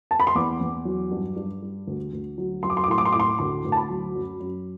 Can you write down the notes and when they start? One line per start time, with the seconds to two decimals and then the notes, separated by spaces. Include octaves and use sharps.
0.11 A5
0.20 B5
0.27 C6
0.35 E2 D6
0.60 E2
0.85 F#3
1.11 G2
1.36 G2
1.62 G3
1.87 D2
2.13 D2
2.38 F#3
2.63 F#3 C6
2.70 D6
2.77 C6
2.84 D6
2.88 A2 C6
2.98 D6
3.05 C6
3.12 A2 D6
3.20 C6
3.39 D2 C6
3.65 D2
3.72 A5
3.77 B5
3.90 F#3
4.15 F#2
4.40 F#2